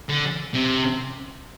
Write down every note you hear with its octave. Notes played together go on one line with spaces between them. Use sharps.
D3
C3